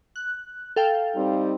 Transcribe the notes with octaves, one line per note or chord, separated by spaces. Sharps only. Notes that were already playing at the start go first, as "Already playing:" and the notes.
F#6
A4 F5 G5
G3 C4 D#4